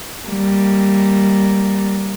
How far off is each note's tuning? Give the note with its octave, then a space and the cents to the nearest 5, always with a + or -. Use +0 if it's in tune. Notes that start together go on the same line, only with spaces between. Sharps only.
G3 +0 A#3 +0